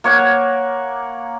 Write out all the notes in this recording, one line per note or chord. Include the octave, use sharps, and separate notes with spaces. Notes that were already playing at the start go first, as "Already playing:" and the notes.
A#3 C#5 F#5